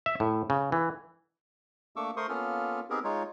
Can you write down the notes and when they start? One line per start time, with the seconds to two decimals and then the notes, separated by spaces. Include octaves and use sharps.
0.06 E5
0.20 A2
0.50 C#3
0.72 E3
1.96 A3 A#3 D4 C#6 D6 E6
2.17 A3 A#4 C5 C6 C#6 D#6
2.29 A#3 B3 C#4 F4 A4 F6
2.90 B3 C4 D#4 G4 G#4 A#4
3.04 G#3 D#4 F4 C#5